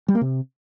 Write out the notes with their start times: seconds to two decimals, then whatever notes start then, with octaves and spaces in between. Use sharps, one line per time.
0.08 G3
0.15 A#3
0.21 C3